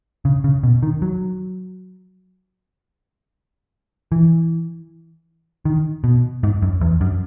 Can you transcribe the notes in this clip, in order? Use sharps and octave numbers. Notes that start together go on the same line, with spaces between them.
C#3
C#3
B2
D#3
F#3
E3
D#3
B2
G#2
F#2
E2
F#2